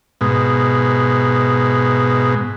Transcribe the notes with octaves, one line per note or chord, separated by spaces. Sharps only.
G#2 B2